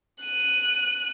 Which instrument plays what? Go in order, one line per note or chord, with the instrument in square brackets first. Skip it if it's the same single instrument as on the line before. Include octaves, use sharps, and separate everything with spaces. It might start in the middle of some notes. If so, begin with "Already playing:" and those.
[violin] F#6 D#7